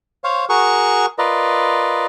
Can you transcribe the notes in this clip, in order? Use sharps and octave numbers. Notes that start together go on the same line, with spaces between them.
C5 C#5 F5
F#4 G#4 A#4 F#5 C#6
F4 A#4 B4 D5 D#5